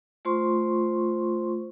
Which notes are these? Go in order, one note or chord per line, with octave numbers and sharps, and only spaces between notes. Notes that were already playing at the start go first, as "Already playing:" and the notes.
A3 F4 C5 C6 C#6